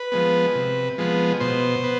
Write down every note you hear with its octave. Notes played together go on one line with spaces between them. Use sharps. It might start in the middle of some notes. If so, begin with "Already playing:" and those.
Already playing: B4
F3 G#3 B3
C3
F3 G#3 B3
B2 C5
B3